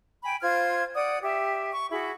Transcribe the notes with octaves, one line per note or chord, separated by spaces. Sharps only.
G5 G#5 B5
F4 C5 F6 G#6
D5 F#5 D#6
G4 E5
C#6
E4 F#4 G#4